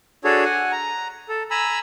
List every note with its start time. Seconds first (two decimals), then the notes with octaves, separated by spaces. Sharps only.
0.24 D4 F#4 G#4 A4 C#5
0.45 F#5 G#5
0.72 A#5
1.29 A4
1.51 G#5 A#5 B5 E6